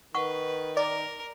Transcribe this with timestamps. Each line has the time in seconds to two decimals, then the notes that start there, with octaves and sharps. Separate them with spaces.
0.15 D#3 B4 F#5 C#6
0.77 A#4 D5